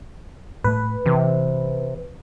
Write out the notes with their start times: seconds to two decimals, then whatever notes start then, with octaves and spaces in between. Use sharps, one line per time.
0.64 A2 A3 B4
1.06 C3 E3